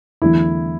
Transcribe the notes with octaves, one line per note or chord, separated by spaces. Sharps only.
E2 D3 F#3 A3 E4